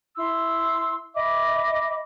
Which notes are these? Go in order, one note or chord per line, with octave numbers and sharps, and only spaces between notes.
E4 C6 E6
D#5 E5 B5 D6